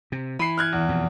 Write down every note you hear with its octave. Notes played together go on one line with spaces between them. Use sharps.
C3
E3 B5 C7
F6 F#6 G#6
E2
F2 B2